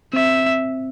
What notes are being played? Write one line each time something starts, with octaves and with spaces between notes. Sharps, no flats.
C4 E5